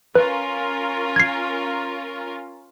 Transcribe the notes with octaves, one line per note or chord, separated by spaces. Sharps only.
C#4 F4 A#4 B4
G#6 C7